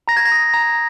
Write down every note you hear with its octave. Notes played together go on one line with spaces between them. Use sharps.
A#5 A#6
G#6
A#6
D#6
A#5